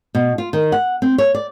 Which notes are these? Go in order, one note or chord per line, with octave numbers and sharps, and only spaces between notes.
B2
F4
D#3
F#5
C4
C#5
D5